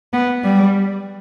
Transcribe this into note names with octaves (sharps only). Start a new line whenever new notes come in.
B3
G3